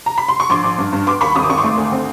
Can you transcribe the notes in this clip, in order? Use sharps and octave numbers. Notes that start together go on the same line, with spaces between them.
A#5
B5
C6
C#6
A#1 C6 D6
A#1
G2
G2
B3 C6 D6
D#2 B5 C#6
G#1 D#6
D6
G#1 C#6
C6 D6
A3
D2
C4